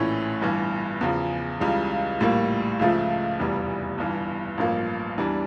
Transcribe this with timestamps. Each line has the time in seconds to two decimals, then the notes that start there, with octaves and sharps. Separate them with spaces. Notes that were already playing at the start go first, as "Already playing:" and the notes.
Already playing: A#1 A2 E3 A3 C#4
0.41 G1 G2 E3
1.01 E2 C#3 F3
1.60 C#2 C#3 E3 G3
2.20 A#1 A2 G3 A#3
2.79 C#2 C#3 F3 A3
3.39 F1 E2 E3 G3
3.98 G1 G2 E3
4.58 A1 G2 F3 A#3
5.18 E2 E3 G3 D4